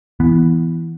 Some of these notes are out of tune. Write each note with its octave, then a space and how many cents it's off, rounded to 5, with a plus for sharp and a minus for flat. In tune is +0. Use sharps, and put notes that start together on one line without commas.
E3 +0 B3 +0